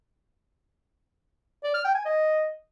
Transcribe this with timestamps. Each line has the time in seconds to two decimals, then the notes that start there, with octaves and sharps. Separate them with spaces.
1.64 D5
1.74 F6
1.84 G5
1.95 G#5
2.05 D#5